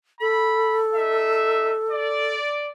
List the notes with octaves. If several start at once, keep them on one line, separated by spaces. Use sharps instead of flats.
A4 B5
D#4 E5
D5